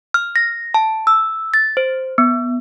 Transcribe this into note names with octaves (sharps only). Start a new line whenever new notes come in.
F6
A#6
A5
E6
A6
C5
B3